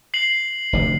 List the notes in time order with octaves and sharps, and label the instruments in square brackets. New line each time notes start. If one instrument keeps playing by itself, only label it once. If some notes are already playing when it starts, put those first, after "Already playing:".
[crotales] C7 F#7
[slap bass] F1 D2 C3